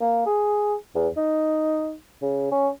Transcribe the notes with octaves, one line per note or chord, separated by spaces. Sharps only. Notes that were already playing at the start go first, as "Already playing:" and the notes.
A#3
G#4
E2
D#4
C#3
C#4